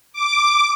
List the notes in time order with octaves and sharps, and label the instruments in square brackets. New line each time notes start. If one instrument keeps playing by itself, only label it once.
[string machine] D6